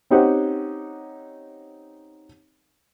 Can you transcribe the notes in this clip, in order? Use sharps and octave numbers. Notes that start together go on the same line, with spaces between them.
C4 C#4 D#4 G4 C5 F#5